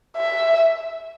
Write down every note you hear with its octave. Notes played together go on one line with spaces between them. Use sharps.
E5